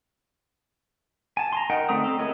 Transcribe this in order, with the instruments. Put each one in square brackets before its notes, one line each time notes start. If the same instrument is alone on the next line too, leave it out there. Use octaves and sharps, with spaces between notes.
[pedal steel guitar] G#5 A5
A#5 C6
D#4 A#4 D#5 F#5 G5
D3 A3 C4 A#5 D#6
C4 A4
G#3 E4 A#4 C#5 D#5